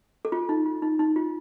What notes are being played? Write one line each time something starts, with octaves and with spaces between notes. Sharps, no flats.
A4
F4
D#4
F4
D#4
D#4
F4